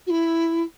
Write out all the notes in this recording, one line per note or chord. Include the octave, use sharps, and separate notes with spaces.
F#4
E4